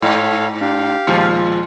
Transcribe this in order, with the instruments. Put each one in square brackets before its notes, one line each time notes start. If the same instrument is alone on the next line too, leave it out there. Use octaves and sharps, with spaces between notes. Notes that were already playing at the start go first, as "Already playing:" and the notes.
[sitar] G#2 [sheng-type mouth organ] A4 C#5 F5
[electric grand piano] D4 [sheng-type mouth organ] G4 F5
[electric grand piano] D#2 F3 G#3 [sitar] A#2 F4